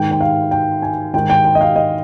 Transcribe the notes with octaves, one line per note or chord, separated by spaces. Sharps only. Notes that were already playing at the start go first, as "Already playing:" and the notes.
Already playing: G#2 D#3 G5
G5
F5
G5
G#5
G#2 D#3 G5
G5
G5
D#5
F5
D#5